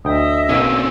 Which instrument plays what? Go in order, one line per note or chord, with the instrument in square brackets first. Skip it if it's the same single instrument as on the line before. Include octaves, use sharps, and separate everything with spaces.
[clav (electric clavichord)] D2 G5 [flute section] D#5 E5 [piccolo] D#6
[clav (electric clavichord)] B1 A#3 [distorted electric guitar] C4 C#4 [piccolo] E6
[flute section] D5